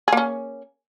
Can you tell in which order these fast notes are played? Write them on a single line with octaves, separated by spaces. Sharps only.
G#4 A#3 C#4